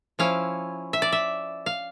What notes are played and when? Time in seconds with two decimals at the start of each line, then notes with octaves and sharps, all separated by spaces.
0.19 F3 C#4 E4 F5
0.93 E5
1.02 D5
1.12 E5
1.66 F5